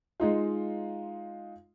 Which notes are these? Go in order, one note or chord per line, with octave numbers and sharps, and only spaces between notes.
G#3 D#4 F4